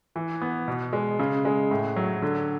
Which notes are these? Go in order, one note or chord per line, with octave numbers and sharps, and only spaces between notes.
E3
B3
B2
G#3
C#3
G#3
A2
F#3
D3